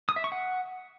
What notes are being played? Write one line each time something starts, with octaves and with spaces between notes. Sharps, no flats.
D#6
E5
C#6
F#5